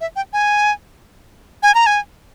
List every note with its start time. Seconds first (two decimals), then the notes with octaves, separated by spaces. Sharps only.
0.01 E5
0.16 G5
0.33 G#5
1.63 G#5
1.75 A#5
1.86 G#5